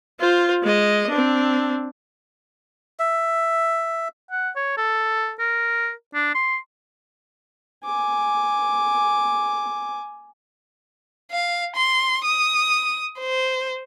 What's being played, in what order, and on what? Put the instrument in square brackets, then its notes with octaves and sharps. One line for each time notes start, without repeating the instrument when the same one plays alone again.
[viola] F4 C5
G#3 D#5
C4 D4
[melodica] E5
[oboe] F#5
C#5
A4
A#4
D4
C6
[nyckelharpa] G#5 D6
[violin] F5
C6
D#6
C5